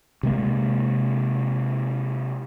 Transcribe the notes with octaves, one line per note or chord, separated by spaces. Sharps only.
C3 G#3 A#3